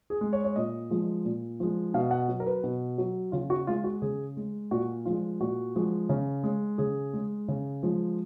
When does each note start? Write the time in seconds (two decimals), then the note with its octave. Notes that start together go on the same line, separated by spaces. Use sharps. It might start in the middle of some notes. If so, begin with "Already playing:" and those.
0.10 G#4
0.21 G#3
0.33 C#5
0.44 C#5
0.56 A#2 D#5
0.90 F3 G#3
1.25 A#2
1.60 F3 G#3
1.94 B2 F5
2.11 F#5
2.28 F#3
2.40 A#4
2.46 B4
2.63 B2
2.98 F#3
3.32 C#3 F4
3.50 F#4
3.67 G#3 F4
3.84 F#4
4.02 C#3 G#4
4.37 G#3
4.71 A#2 F#4
5.05 F3 G#3 F4
5.40 A#2 F#4
5.75 F3 G#3
6.09 C#3
6.43 G#3
6.78 C#3 G#4
7.13 G#3
7.48 C#3
7.83 F3 G#3